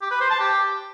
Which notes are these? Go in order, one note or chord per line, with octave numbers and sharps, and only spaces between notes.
G4
B4
C5
A5
G4